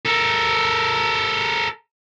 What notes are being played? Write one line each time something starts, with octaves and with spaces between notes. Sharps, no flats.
A4 A#4